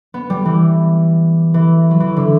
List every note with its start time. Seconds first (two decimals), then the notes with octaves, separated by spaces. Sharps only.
0.14 B3
0.30 G3
0.45 E3
1.54 E3
1.91 F#3
2.00 E3
2.16 D3